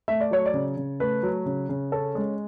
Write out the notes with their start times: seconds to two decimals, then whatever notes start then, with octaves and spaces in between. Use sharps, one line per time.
0.08 A3 E5
0.21 D5
0.31 F#3 C#5
0.46 D5
0.54 C#3
0.77 C#3
1.00 A3 B4
1.23 F#3
1.46 C#3
1.69 C#3
1.92 C#4 A4
2.15 G#3